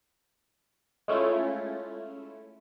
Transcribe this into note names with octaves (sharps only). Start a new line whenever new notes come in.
G#3 A3 C#4 E4 F4